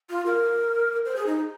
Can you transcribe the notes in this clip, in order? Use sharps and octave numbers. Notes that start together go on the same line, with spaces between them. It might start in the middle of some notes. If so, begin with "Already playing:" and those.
F4
A#4
C5
G#4
D#4